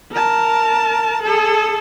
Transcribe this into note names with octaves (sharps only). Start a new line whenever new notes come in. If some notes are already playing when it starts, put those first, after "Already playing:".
A#4 A5
G#4 A4